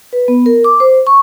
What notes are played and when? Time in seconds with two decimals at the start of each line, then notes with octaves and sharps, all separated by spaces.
0.13 B4
0.28 B3
0.46 A#4
0.64 D6
0.80 C5
1.07 C#6